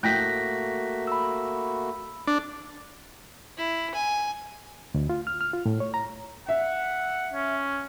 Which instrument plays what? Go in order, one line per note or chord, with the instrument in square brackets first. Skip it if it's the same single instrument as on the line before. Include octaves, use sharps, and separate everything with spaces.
[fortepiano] A2 G5 [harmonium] A3 A#3 F#4 [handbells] F#6 A#6 B6
[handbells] B5 E6
[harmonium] F2 [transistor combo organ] D4
[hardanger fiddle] E4
G#5
[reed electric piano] D2
F4
F6
F6
F4
A2
C#5
A#5
[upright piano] E5 [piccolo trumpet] F#5
[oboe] C#4